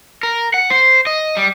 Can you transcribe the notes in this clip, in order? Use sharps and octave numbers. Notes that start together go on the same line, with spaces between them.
A#4
F#5
C5
D#5
G3